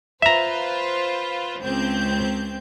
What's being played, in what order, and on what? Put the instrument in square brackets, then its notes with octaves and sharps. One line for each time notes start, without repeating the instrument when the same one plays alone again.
[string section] F4 B4 C5 [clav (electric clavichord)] E5 A#5
[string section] C#2 C4 G6